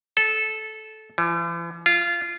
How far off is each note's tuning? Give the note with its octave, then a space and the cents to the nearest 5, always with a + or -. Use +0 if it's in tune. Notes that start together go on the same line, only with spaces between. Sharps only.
A4 -15
E3 +45
F4 -20